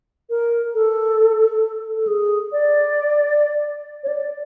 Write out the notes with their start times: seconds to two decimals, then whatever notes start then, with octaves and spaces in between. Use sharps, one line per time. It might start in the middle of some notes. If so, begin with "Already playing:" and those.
0.30 A#4
0.75 A4
1.96 A4
2.07 G#4
2.52 D5
4.03 C#5
4.08 D5